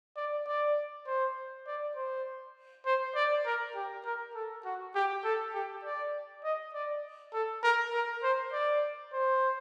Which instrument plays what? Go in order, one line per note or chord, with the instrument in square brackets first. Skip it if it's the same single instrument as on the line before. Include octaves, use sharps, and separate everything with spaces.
[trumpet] D5
D5
C5
D5
C5
C5
D5
A#4
G4
A#4
A4
F#4
G4
A4
G4
D5
D#5
D5
A4
A#4
A#4
C5
D5
C5